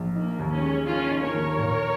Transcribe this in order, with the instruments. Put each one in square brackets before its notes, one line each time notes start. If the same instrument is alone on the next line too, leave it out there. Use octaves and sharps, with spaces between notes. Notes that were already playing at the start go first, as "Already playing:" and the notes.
Already playing: [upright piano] A#1
[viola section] A#3 [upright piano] D#4
[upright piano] D#2
[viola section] C#4
[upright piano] G#3
[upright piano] D#3 [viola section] C#4 F4
[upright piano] D#4
[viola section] A#4 C#5
[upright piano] D#2
A#2